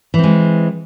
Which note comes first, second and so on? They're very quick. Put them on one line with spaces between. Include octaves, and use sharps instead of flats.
E3 C4 G#3